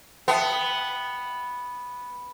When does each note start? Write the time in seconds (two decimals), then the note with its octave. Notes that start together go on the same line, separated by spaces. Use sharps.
0.28 B3 E5 G5 A5